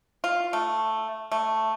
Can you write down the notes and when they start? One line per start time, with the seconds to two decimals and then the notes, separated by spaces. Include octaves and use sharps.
0.24 F4
0.53 A3
1.32 A3